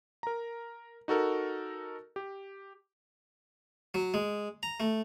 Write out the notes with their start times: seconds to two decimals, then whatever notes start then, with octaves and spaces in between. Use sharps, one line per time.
0.23 A#4 A#5
1.08 D#4 F#4 A4 A#4
2.16 G4
3.94 F#3
4.14 G#3
4.63 A#5
4.80 A3